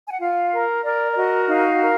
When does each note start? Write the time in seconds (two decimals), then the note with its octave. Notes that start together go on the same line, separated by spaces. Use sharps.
0.06 G#5
0.13 F#5
0.20 F4 F5
0.52 A#4
0.84 A#4 D5
1.11 D5
1.16 F#4 D#5
1.48 D#4 F5
1.80 A#4